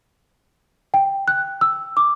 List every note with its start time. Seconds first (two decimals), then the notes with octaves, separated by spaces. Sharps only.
0.94 G5
1.28 F#6
1.61 E6
1.97 D6